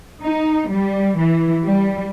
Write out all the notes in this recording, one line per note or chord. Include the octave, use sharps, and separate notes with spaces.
D#4
G3
E3
G3